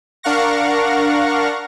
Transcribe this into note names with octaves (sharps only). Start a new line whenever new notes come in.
D4 A#4 F5 F#5 C#6 A#6